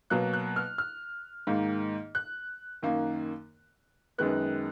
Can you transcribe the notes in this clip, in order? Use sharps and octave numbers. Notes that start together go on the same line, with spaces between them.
B2 F#3 A#3 F#6
F#6
F6
F6
G#2 D#3 A#3
F#6
F#2 D#3 A#3
F#2 D#3 G#3 B3 F#6